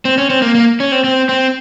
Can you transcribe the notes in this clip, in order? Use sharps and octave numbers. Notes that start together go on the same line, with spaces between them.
C4
C#4
C4
A#3
A#3
C#4
C4
C4
C4